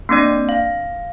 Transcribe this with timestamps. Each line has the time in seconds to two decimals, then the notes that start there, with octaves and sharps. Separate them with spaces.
0.09 A#3 C4 D4 D5
0.49 F5